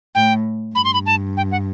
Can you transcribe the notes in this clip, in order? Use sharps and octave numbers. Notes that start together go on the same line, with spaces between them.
A2 G5
G2 B5
C6
B5
A5
G5
F#5